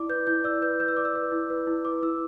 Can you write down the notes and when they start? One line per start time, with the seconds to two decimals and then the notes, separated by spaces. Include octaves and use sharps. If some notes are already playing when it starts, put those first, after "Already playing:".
Already playing: E4 D5 D6
0.09 B4 G6
0.27 E4 G6
0.44 D5 E6
0.62 B4 G6
0.80 B4 G6
0.88 E6
0.97 D5 D6
1.05 E6
1.15 B4
1.32 E4
1.50 B4
1.67 E4
1.85 B4 D6
2.02 E4 E6